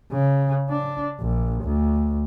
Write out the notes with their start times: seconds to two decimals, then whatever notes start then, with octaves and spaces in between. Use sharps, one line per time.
0.12 C#3
0.70 D4
1.20 A#1
1.63 D2